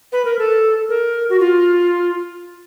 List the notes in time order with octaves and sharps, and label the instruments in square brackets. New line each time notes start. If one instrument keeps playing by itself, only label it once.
[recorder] B4
A#4
A4
A#4
F#4
F4